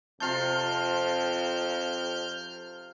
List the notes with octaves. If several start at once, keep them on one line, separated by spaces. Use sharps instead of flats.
F2 C3 F4 A5 F6 G6